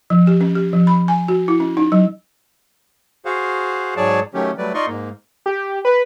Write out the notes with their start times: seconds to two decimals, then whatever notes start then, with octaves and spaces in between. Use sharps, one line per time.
0.10 F3
0.27 G4
0.41 C#4
0.55 G4
0.73 F3
0.87 B5
1.08 G#5
1.28 F#4
1.48 E4
1.60 C#4
1.77 D#4
1.92 F#3
3.25 F#4 G#4 C5 F5 F#5
3.97 G#2 F#3 G#4 C#5 D5 A5
4.34 D#3 F#3 A3 C#4 G4
4.58 F#3 G3 A3 B4 D5
4.74 D#4 F4 D5 D#5 C6 C#6
4.87 G#2 A#3
5.46 G4
5.85 B4